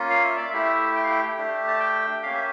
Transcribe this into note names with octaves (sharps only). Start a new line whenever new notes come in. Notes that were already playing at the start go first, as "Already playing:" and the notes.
Already playing: A#3 C#4 F4
F5
E5
D5
A3 E4 G4 E5
G5
F5
G5
A3 D4 G4
A5
G5
A#3 C#4 G4 F5
E5